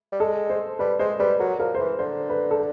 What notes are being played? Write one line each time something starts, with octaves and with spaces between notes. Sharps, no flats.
G3
G#3 A4
C5
G3 B4
G#3 C5
G3 B4
F#3 A#4
F3 A#4
C5
E3 B4
D3 C5
B4
A4